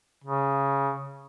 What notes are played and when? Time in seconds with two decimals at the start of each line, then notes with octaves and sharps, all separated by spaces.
0.24 C#3